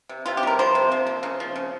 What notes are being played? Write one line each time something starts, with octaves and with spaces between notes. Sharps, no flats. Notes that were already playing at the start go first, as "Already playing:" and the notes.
C3
C3 F4
G4
G3 A#4
F3 C5
C3
F3
A#3
C#3
F3
C#3